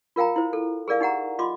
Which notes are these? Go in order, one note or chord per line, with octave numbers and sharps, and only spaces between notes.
F4 A#4 F5 G5 A#5
E4 C5
A4
G#4 A#4 D5 F5
D#4 G4 F#5 A#5
F4 D#5 C6 D6